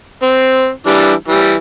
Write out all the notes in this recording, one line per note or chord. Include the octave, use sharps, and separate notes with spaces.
C4
E3 G3 D4
E3 G3